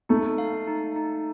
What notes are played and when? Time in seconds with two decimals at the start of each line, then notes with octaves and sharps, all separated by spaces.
0.09 A3 D#4
0.38 F5
0.67 D#4
0.96 D#4